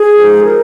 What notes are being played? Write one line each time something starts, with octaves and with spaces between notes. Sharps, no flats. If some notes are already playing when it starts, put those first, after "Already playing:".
Already playing: G#4
F3 G#3 D#4
A#4